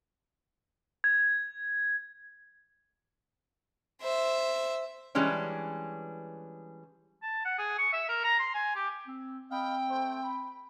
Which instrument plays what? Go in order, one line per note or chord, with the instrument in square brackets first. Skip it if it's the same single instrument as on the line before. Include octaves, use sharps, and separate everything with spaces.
[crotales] G#6
[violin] C5 E5
[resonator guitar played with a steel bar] E3 G3 G#3 C#4 D4
[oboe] A5
F#5
G#4
C#6
E5
A#4
A#5
C6
G#5
G4
[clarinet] C4
[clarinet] C4 [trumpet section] D#5 F5 B5 [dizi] G5
[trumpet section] A3 C5
B5